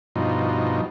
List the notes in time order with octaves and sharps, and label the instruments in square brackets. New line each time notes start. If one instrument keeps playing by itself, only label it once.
[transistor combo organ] G2 B2 F3 D#4